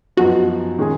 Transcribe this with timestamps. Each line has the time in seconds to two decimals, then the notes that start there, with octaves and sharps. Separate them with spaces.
0.17 F#2 F3 B3 D#4 F#4
0.79 D#3 G#3 C#4 G#4